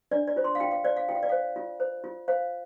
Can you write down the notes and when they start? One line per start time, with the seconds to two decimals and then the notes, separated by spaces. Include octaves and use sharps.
0.11 D4 D5
0.27 D5
0.36 F4 C5
0.44 C6
0.55 F5
0.60 F4 G5
0.71 F5
0.84 C5 D5
0.97 F5
1.09 F4 G5
1.15 F5
1.23 D5
1.29 C5 F5
1.56 F4
1.80 C5
2.04 F4
2.28 C5 F5